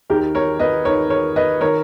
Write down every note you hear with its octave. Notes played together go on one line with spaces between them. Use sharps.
D#2 D#3 G4 A#4
A#4 C#5
B4 D#5
D#2 D#3 A#4 C#5
A#4 C#5
B4 D#5
D#3 A#4 C#5